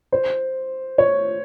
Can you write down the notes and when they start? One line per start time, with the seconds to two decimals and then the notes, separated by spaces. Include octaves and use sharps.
0.12 C5
0.98 C#5